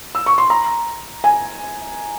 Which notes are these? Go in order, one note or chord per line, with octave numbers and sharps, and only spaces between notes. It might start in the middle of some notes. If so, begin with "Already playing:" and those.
E6
C#6
C6
A#5
G#5